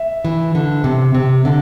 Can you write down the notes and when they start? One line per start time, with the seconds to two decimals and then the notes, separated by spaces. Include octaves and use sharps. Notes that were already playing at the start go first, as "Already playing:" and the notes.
Already playing: E5
0.25 E3
0.55 D3
0.84 C3
1.15 C3
1.45 D3